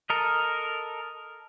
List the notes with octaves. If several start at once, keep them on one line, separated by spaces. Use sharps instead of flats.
A4 A#4 D#5